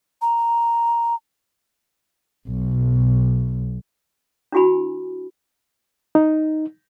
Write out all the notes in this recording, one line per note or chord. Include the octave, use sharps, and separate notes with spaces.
A#5
B1
D4 E4 F#4 G#5 B5
D#4